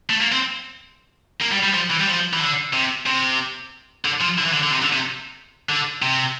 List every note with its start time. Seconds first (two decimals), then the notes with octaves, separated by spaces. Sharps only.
0.10 A3
0.21 A#3
0.32 C4
1.42 A#3
1.52 G3
1.64 G3
1.74 F3
1.91 E3
2.00 G3
2.07 F3
2.33 E3
2.41 D3
2.74 C3
3.06 C3
4.05 D3
4.21 F3
4.38 D3
4.45 E3
4.53 D3
4.64 D3
4.71 C3
4.82 D3
4.93 C3
5.69 D3
6.02 C3